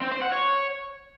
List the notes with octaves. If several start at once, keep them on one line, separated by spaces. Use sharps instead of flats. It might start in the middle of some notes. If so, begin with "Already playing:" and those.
C4
C5
F#5
C#5